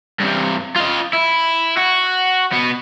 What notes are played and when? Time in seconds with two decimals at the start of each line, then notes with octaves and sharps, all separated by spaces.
0.20 G2 C3
0.76 F4 D#5
1.13 E4
1.77 F#4
2.53 B2 B3